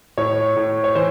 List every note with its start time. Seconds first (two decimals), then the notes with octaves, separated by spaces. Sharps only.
0.18 A2 C#5
0.56 A2
0.84 C#5
0.95 E3 C5